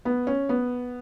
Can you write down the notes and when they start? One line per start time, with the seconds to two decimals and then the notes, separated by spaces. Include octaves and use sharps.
0.05 B3
0.27 C#4
0.49 B3